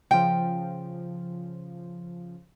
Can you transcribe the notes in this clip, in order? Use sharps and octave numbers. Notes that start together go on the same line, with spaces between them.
C#3 F3 G5